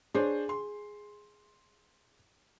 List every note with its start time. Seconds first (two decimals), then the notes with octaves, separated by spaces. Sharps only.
0.15 D4 G#4 C5 C#5
0.49 C6